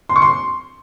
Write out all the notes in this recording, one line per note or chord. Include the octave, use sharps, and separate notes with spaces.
C6
C#6
C6